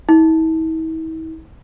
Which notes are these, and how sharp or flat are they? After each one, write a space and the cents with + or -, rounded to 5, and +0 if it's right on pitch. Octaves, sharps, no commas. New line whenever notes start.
E4 -45